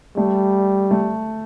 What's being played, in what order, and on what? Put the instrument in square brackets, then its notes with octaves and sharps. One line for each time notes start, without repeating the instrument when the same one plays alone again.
[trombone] G3 [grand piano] A3
[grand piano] A3